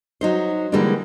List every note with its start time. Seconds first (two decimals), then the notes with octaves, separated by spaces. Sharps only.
0.21 F#3 D#4 C5
0.72 D3 E3 G3 G#3 A#3 D4